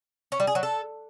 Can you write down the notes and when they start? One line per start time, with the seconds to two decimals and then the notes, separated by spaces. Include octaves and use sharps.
0.32 C#4
0.40 G3
0.47 G#4
0.55 F#3
0.63 A4